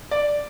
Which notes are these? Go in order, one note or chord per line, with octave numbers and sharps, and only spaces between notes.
D5